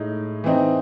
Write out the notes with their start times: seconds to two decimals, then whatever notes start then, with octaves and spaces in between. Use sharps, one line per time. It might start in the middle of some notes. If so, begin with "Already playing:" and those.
Already playing: A2 G#3 D#4
0.44 E3 C4 D#4